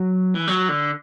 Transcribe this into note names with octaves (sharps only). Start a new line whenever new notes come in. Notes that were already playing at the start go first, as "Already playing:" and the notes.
Already playing: F#3
E3
F#3
D3